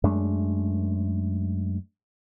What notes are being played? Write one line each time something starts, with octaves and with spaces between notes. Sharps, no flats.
F#2 G#3 A3 D4